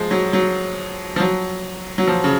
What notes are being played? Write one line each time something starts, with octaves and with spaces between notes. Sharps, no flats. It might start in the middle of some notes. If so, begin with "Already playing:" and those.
Already playing: F3 G#3
F#3
F#3
F3
F#3
F#3
F3
C#3